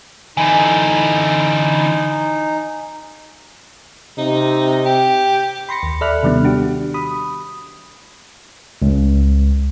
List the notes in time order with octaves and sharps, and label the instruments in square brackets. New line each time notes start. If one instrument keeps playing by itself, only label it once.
[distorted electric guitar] D3 E3 [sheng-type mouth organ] D#4 [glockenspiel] G#5
[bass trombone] C3 [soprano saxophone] D#4
[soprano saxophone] G4
[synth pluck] B5 C6 A#6 C#7
D#2
A4 D5 E5 B5 F6 F#6
C3 D#3 G3 B3 D4
D4 F#4 G4
B5 D#6
[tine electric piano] C#2